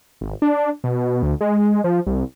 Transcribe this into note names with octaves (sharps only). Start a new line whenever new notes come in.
G#1
D4
B2
D2
G#3
F3
C2